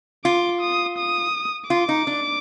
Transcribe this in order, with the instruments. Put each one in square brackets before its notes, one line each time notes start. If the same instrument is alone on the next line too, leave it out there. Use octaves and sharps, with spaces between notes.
[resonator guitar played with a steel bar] F4 [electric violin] D6
[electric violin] D#6
D#6
[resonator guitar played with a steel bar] F4 [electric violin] D6
[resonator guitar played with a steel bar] D#4
D4